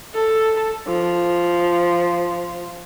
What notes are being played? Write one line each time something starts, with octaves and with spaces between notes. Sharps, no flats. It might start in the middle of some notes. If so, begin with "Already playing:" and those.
A4
F3